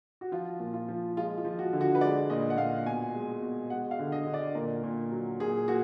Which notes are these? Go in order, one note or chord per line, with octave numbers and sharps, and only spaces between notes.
F#4
F3 F4
A#2
F4
F3
G#3 F4
F4
F3
F#4
D3
F#4
B4
G#3 D5
A#2 D#5
F#5
A#2 F5
B2 G#5
G#3
B2
G#3 F#5
F5
D3
D#5
D3
D5
A#2 A#4
A#2
F#3
A#2 G#4
A#2 F#4